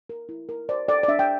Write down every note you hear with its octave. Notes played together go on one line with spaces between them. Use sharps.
A#4
E4
A#4
C5 D5
A4 D5
D5
D4 E5
G5